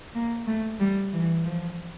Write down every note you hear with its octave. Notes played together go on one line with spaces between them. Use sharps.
A#3
A3
G3
E3
F3